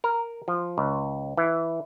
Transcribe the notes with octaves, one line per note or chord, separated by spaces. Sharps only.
A#4
F3
C#2
E3